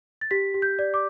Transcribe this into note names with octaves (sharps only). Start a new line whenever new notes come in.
A6
G4 B6
G4
G6
D5
D6